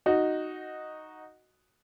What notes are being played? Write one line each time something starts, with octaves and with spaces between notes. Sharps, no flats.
D#4 F#4